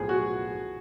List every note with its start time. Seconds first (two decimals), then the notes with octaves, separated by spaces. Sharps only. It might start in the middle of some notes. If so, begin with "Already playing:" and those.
Already playing: B1 A2 F3 G#4
0.09 F#4